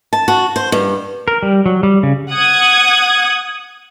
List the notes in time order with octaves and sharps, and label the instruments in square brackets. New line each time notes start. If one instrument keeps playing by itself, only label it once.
[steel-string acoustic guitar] A5
F#4
C5
G2
[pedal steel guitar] A#4
G3
F#3
G3
C#3
[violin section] F#5 D#6 G#6